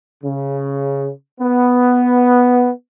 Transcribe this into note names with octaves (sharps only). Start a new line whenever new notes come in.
C#3
B3